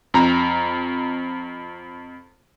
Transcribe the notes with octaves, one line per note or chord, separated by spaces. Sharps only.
F2 A#5